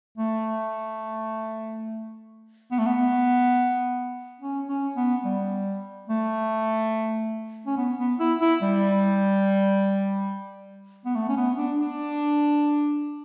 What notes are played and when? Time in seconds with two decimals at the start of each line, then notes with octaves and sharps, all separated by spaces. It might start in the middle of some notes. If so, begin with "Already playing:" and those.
0.18 A3
2.71 B3
2.79 A3
2.86 B3
4.40 C#4
4.68 C#4
4.96 B3
5.24 G3
6.09 A3
7.66 C#4
7.77 B3
7.99 B3
8.20 E4
8.41 E4
8.62 G3
11.05 B3
11.15 A3
11.29 C#4
11.37 B3
11.57 D4
11.78 D4